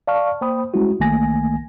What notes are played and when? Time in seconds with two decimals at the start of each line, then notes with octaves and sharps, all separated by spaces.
0.07 D5 F5 A5 C#6 F6
0.41 A#3 C5 G5 B5 D#6
0.74 G3 G#3 C#4 E4 F#4
1.00 B1 D#3 A3 A#3 G#5 A#6